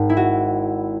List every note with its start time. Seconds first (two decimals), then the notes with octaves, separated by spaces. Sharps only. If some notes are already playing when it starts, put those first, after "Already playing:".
Already playing: G#1 G#2
0.10 E4
0.17 F#4